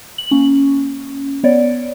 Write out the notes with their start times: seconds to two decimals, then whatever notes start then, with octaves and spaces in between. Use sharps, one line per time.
0.18 F#7
0.31 A#3 C#4
1.43 B3 C#5 D5